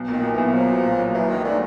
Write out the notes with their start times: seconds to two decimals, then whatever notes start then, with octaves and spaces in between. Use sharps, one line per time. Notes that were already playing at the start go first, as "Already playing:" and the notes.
Already playing: B1
0.08 A#2 D#3
0.23 B1
0.33 B1 E3
0.53 F3 F#3
0.69 F#3
0.84 A#2
0.99 F#3
1.14 E3 F#3
1.29 D#3 F#3
1.44 D3 A3